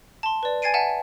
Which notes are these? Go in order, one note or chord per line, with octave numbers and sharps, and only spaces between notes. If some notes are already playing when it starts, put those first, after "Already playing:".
A5 C6
B4 D5
G#5 G#6 A6 C7 D7 D#7
E5 F#5 G#5 A5